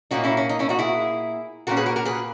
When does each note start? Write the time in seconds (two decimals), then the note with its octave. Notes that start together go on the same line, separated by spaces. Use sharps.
0.11 A#2 A#3 C#4 D#4 F#4
0.24 C#4 E4
0.37 C#4
0.49 D#4
0.59 C#4 E4
0.69 D#4 F#4
0.79 E4 G#4
1.67 A#2 A#3 C#4 F#4 A#4
1.76 G#4 B4
1.86 F#4 A#4
1.96 F#4 A#4
2.05 G#4 B4